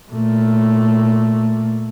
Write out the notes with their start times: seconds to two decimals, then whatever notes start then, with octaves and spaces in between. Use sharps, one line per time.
0.12 A#2 A3